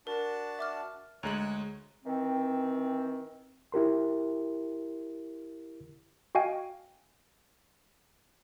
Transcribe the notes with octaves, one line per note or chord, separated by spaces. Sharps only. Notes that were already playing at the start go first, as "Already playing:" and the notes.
D4 F#4 A#4 A5
E5 D6 F6
D2 G#3 C#5 A#5 F#6 F#7
D#3 E3 C4
E4 G4 A#4 C6
F#4 D#5 F5 G5 G#5